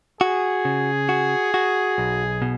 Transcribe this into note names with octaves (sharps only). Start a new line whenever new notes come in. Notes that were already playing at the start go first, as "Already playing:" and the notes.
F#4 G#4
C#3
F#4
F#4
B1
B2